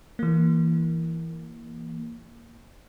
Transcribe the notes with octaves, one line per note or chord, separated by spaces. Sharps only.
E3 A#3